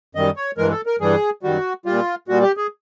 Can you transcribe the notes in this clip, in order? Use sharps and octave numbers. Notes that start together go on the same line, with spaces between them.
F#2 D#3 G3 D#5
C#5
G2 E3 G#3 A#4
A4
A#4
G2 E3 G3 G#4
F#2 D#3 G3 F#4
A#2 G3 F4
A#2 G3 F#4
G4
G#4